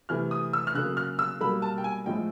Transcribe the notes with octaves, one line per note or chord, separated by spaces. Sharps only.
C3 E3 A3 F6
D#6
E6
F6
C#3 F#3 A#3 F#6
F6
E6
B2 G3 A#3 B5
A5
G5
G#5
A2 F3 G#3 G5